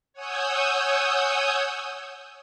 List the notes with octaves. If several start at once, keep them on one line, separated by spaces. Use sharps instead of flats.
C#5 F#5 G#5 D#6 E6 G6